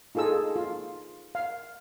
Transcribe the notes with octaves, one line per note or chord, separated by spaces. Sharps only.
D#4 F4 G#4 A4 E6
F4
F5